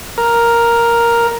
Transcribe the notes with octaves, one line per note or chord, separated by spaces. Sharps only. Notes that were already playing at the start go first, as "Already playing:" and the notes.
A#4